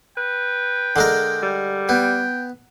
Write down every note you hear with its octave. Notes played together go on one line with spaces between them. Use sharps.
B4 G5
D3 G#3 A#4
G3
B3 G5